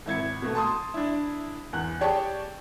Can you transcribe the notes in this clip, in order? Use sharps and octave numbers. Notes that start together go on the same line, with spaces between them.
G#1 E4 G#6 C#7
B2 A3
A5 C6 D#6
D4 E4
E2 F#6
G4 G#4 C#5 D5 G5 A5